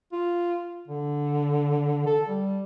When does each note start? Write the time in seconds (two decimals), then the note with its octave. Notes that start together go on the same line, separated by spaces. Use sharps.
0.12 F4
0.88 D3
2.06 A4
2.28 G3